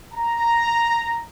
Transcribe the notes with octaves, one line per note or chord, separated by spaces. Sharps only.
A#5